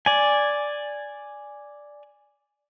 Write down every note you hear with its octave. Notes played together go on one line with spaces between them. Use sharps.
D5 G#5